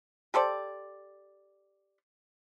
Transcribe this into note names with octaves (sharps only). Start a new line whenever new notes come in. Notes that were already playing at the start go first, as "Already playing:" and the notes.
G4 A4 C5 D5